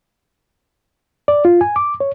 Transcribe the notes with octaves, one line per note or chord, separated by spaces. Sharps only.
D5
F4
G#5
D6
C#5